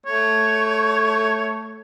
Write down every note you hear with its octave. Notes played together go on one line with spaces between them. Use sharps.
A3 C#5